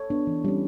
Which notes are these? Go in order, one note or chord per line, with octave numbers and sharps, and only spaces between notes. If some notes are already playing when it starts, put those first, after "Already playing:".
Already playing: A4 C#5
B3 D4
E3
G3 C#4